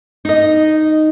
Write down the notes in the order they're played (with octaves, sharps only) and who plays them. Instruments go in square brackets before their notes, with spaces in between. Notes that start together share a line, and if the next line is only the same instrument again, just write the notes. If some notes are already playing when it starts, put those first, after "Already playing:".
[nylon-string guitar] D#4 D#5